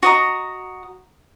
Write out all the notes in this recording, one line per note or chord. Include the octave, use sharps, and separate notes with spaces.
F#4 D#5 A#5